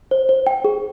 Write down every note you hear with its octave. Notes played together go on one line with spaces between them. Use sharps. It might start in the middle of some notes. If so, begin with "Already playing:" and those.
C5
C5
G5
G#4